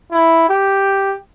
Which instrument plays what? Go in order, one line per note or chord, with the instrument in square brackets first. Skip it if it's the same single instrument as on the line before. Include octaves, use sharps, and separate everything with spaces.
[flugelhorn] E4
G4